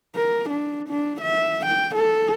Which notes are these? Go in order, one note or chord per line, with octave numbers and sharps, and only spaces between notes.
A#4
D4
D4
E5
G5
A4